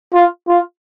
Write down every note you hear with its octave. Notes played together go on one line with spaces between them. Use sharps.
F4
F4